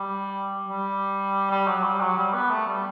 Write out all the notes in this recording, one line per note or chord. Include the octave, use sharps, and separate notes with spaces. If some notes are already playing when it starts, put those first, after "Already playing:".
Already playing: G3
G3
G3
F#3
G3
F#3
G3
B3
A3
G3